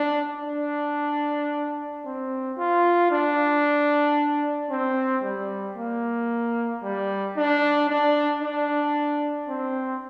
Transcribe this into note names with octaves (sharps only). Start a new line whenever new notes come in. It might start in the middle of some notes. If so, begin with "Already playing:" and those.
Already playing: D4
D4
C4
F4
D4
C4
G3
A#3
G3
D4
D4
D4
C4